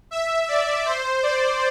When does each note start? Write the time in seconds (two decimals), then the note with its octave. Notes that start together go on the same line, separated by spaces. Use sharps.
0.11 E5
0.48 D5
0.86 C5
1.23 D5